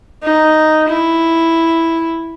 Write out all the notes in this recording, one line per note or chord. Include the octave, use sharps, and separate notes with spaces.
D#4
E4